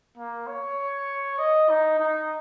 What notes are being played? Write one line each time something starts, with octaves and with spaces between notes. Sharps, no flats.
A#3
C#5
D#5
D#4
D#4